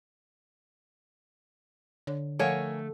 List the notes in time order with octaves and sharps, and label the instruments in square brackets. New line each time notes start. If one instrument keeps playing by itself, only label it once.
[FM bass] D3 [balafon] C#5
[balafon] F3 F5 F#5 [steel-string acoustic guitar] A3 [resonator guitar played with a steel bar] A#4 C#5 G#5